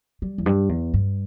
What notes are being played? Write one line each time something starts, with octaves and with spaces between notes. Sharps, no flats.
G3
E2
G2
E2
G2